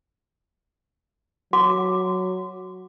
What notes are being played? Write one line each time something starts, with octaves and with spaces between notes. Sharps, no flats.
F#3 F#4 F#5 D6